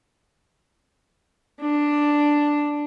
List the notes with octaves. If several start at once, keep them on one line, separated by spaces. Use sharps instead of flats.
D4